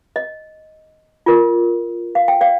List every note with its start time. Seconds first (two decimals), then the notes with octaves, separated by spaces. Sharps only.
0.16 D#5
1.26 F4 A#4
2.15 F5
2.28 G5
2.41 D5 F5